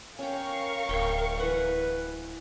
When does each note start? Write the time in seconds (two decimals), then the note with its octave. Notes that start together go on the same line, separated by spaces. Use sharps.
0.19 C#4 A#4 F5 G5 C#6
0.89 D1 G5
1.40 E3 B4 F#5